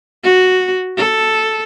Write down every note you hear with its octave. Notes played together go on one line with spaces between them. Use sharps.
F#4
A4